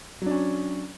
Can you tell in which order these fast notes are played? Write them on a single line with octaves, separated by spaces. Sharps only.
F#3 D4 C#4